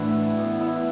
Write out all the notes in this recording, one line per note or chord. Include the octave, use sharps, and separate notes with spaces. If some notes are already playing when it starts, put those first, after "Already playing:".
Already playing: A2 E3 D4 E4 F#4
B3
E4